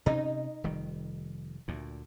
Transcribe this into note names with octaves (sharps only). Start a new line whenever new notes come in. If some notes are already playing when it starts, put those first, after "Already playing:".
C3 C#4 D#4
F1 D#3 G3
D2 A#2